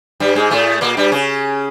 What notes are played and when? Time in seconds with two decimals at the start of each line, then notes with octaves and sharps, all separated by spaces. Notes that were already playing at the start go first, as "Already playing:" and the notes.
0.20 G2 G3
0.35 G#2 G#3
0.51 A2 A3
0.81 A#2 A#3
0.97 G2 G3
1.12 C#3 C#4